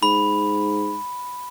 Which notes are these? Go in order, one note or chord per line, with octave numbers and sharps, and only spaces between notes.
G#2 B5